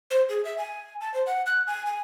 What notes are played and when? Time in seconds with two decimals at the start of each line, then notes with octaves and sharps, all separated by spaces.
0.11 C5
0.29 G#4
0.45 E5
0.58 G#5
1.01 A5
1.14 C5
1.26 F#5
1.46 F#6
1.67 G#5
1.87 G#5